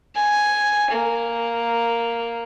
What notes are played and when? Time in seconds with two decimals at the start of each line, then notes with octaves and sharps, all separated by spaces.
0.15 G#5
0.91 A#3